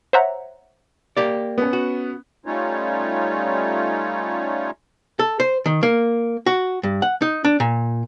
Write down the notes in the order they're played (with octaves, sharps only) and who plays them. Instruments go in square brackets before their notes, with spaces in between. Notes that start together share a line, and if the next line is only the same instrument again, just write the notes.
[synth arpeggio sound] C5 C#5 E5 F#5 A#5
[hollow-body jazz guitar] A#3 G4 D5
[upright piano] B3 C#4
[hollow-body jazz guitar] F#4
[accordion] G3 A3 C#4 D#4 F4 C#5
[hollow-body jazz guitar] A4
C5
D#3
A#3
F#4
G2
F#5
D#4
D4
A#2